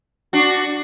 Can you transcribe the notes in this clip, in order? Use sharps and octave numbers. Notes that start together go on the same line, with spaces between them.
D4 F#4